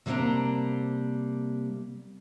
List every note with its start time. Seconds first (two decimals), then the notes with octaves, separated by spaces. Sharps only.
0.06 C3 G3 A#3 D4 C5 A#5